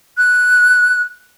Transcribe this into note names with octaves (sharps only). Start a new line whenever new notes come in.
F#6